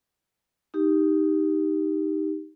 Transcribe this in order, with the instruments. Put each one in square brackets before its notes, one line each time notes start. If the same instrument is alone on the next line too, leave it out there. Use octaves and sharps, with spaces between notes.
[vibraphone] D#4 G4